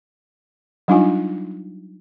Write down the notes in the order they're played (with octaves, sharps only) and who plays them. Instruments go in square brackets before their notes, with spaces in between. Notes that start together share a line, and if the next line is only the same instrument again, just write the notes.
[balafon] F#3 G3 D4 D#4 F4 G#5